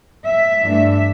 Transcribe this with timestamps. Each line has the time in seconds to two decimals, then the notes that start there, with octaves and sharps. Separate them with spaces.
0.24 E5
0.62 G2 E3 A3 D4